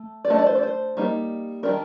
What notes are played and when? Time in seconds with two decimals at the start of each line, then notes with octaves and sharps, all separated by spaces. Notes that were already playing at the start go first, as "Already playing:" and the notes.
Already playing: A3
0.25 D5
0.30 A3 D4 D#5
0.39 D5
0.46 C5
0.55 D5
0.63 C5
0.97 G3 A#3 D#4
1.63 D#3 G3 D4 A#4